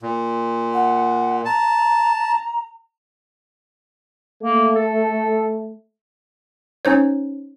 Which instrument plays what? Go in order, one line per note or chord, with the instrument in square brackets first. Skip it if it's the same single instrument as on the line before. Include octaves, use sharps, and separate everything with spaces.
[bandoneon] A#2
[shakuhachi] F#5
[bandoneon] A5 [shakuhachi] A#5
[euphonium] A3 [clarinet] A#3
[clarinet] A4
[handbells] C#4 D#4 C5 C#5